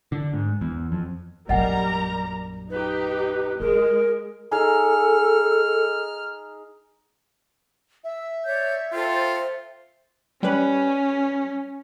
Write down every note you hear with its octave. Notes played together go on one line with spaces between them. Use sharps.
D3
G#2
E2
F2
A#1 F#2 G3 A#4 D#5 F#5 G#5 A#5
D#4 G4 B4
G#3 F4 A#4
D#4 G#4 A4 F6
E5 E6
C#5 D5 G6
F4 A4 C5 G5
G3 C#4 B4